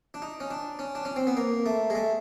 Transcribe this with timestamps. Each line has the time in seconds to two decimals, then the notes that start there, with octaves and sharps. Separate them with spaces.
0.14 D4
0.22 D#4
0.40 C#4
0.51 D4
0.79 C#4
0.95 D4
1.05 C#4
1.16 C4
1.27 B3
1.37 A#3
1.66 A3
1.90 G#3
1.95 A3